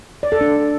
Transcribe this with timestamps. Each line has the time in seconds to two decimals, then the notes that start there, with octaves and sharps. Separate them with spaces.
0.23 D5
0.32 A4
0.41 D4